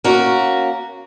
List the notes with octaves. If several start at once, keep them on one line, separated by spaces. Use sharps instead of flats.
A#3 C#4 F#4